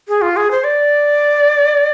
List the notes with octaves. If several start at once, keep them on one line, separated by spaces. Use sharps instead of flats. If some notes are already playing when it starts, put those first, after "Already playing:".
G#4
F4
G#4
C5
D5